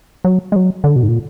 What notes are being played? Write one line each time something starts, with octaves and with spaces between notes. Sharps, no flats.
F#3
G#3
F#3
D3
B2
G#2
A#2